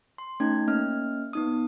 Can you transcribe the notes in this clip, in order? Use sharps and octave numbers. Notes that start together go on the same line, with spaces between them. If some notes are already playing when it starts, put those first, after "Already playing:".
C6
A3 C#4 D#4 G#6
A#3 C#4 D#5 F6
B3 D#4 D#6